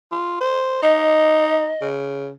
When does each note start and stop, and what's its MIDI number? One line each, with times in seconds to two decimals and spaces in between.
0.12 0.39 65
0.41 0.79 72
0.83 1.72 63
0.83 1.87 75
1.82 2.31 49